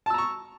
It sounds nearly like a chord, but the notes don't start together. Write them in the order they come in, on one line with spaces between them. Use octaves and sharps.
A5 E6 A#5 C#6